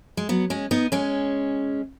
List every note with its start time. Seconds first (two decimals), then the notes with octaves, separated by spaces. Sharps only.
0.17 G#3
0.29 F#3 B3
0.50 G#3 C#4
0.71 B3 D#4
0.92 G#3 C#4